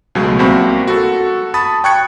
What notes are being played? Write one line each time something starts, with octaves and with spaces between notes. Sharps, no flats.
C#2 B2 F#3 G#3 A3
C2 A#3 C4 F#4 B5
F#4 A4
A5 B5 D#6 A6
G5 C#6 F#6 G#6 C#7